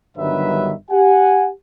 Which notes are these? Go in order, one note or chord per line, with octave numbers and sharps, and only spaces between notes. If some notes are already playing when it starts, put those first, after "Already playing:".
G1 G2 D#3 F#3 B4 E5
G4 F#5 G#5